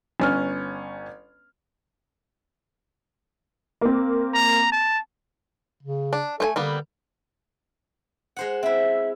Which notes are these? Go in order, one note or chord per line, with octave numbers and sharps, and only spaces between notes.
G1 C#4 F6
A#3 C4
A#5
A5
C#3
D4
A3 A4 C5 G#5
D3 G3 A#3 B3
G#3 C5 F#5
C4 E4 E5